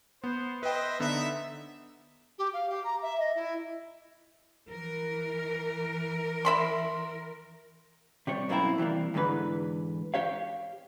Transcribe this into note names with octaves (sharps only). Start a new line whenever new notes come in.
B3 C5
B4 C5 D#5 E5 G5
D3 B3 D#4 E5
G4
F5
G4
A#5
E5
D#5
E4
E3 A#4
E5 B5 C6
C3 G3 C#5
F#2 B2 A#3 C4 E4
C3 E3 G3 A#3
E2 G#2 D3 E3 B4
G4 C#5 F5